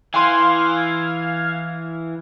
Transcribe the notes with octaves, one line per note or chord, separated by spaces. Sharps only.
E3 F5 G#5 C6 F6 G#6